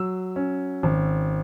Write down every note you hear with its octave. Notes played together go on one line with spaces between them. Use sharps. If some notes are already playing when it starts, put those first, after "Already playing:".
Already playing: F#3 E6
C#4
G#1